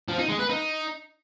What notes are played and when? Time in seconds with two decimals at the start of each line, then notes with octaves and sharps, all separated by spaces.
0.09 F3
0.19 D#4
0.29 G#3
0.39 B4
0.50 D#4